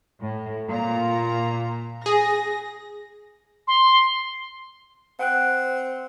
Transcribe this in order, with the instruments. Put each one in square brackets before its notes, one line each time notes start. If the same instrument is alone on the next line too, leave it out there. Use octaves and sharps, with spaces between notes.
[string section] A2
A#2 A#5
[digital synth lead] G#4 [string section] A#6
[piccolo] C6
[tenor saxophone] C4 [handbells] F#5 G5 F#6